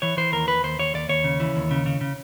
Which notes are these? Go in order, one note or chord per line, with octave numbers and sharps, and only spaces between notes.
E3 C#5
E3 C5
D#2 A#4
D#2 B4
D#2 C5
D#2 C#5
D#2 D5
D#2 C#5
C#3
E3
D#2
C#3
C#3
C#3